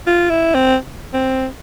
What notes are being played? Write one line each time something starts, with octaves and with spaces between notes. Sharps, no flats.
F4
E4
C4
C4